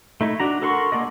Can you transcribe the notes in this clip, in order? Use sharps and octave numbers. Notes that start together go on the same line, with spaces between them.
A3 D#4 E4
D4 F#4 A#5
A4 A#4 F#5 C6 C#6
G#3 A#3 A4 D5 D#5